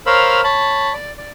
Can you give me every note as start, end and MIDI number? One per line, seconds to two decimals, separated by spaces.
0.06 0.41 70
0.06 0.41 72
0.06 0.41 73
0.06 0.41 77
0.06 0.41 83
0.06 0.41 88
0.44 0.93 73
0.44 0.93 81
0.44 0.93 83
0.93 1.11 74
1.18 1.31 74